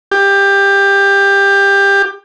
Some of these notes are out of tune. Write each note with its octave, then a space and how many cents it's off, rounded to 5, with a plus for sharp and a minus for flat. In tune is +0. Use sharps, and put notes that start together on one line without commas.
G4 +20